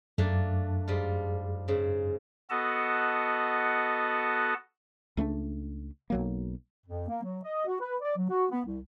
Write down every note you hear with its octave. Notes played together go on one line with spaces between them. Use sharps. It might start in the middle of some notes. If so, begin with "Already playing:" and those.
F#2 A3 A#3 D4
G#2 G3 F4
G#2 C#3
B3 F#4 A4 D#5 F#5 A5
C#2 A3 C#4 D4
B1 F#3 A#3
F2
A#3
F#3
D#5
F#4
B4
D5
F#3
F#4
B3
C2